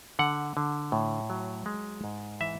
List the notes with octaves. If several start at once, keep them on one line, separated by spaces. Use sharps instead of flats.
D3 F#5
D3
A2
F#3
G#3
G#2
E3 E5